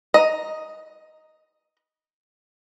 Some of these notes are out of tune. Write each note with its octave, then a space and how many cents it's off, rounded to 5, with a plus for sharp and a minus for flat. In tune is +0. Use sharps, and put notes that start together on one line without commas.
D#5 +5 A#5 +0